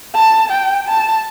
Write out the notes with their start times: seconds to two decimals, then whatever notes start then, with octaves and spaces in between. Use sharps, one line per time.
0.15 A5
0.51 G5
0.87 A5